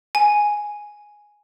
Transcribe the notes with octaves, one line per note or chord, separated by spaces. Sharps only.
G#5